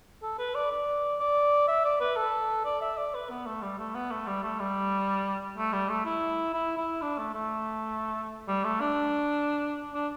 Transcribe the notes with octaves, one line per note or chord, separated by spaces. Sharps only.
A4
B4
D5
D5
D5
E5
D5
B4
A4
D5
E5
D5
B4
B3
A3
G3
A3
B3
A3
G3
A3
G3
A3
G3
A3
E4
E4
E4
D4
A3
A3
G3
A3
D4
D4